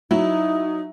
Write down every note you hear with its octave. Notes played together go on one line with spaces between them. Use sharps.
F#3 D#4 E4